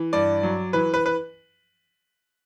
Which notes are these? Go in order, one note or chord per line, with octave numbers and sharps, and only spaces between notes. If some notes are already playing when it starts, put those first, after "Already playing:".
Already playing: E3
G2 D5
F#3
E3 B4
B4
B4